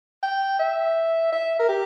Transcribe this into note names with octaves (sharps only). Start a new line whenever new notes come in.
G5
E5
E5
A#4
G4